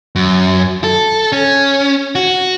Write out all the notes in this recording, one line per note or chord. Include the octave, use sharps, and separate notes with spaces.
F#2
A4
C#4
F#4